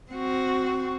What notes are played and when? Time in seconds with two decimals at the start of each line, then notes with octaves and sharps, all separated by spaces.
0.11 C4 F#4